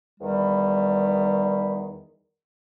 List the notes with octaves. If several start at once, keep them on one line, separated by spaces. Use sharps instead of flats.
E2 D#3 G3